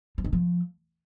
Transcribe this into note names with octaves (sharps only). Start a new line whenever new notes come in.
F3
D#3
F3